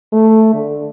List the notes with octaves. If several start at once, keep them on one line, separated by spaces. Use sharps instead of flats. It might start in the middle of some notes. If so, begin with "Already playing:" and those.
A3
D3